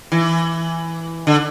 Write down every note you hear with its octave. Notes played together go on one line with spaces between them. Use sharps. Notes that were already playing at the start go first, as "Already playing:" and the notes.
E3
D3